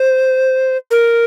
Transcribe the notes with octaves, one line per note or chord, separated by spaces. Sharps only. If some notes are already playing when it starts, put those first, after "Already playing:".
Already playing: C5
A#4